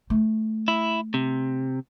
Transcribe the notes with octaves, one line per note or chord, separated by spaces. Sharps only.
A3
E4
C3